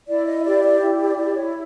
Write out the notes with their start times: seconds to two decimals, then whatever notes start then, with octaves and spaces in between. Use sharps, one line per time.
0.08 E4 D5
0.26 D#5
0.45 G4 D5
0.63 D5
0.81 E4
0.99 D5
1.17 E4 D5
1.35 C#5